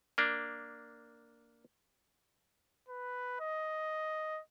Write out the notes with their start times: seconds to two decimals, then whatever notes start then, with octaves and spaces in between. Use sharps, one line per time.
0.18 A#3 D4
2.88 B4
3.40 D#5